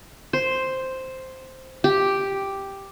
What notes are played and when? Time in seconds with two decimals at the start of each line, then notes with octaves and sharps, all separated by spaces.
0.33 C5
1.84 G4